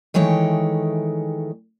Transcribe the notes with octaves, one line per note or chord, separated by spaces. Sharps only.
D#3 E3 G#3 A3 C#5 G5